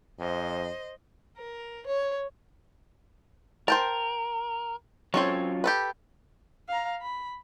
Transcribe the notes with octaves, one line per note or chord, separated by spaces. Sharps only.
F2 C5 D#5
A#4
C#5
A#4 C5 G5 A5
F#3 C4 C#4 F4 A4 C#5
G4 A4 B4
F5 A#5
B5